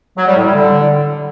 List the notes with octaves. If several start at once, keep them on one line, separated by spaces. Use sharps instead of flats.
F#3
G3
A2
G3
D3